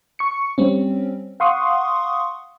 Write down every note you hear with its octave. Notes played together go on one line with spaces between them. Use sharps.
C#6 C#7
G3 C4 C#4
F5 F#5 C6 C#6 D#6